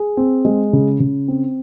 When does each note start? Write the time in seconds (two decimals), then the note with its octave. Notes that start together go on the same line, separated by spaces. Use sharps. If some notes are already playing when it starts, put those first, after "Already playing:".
Already playing: G#4
0.17 C4
0.45 G#3
0.73 C#3
1.00 C#3
1.28 C4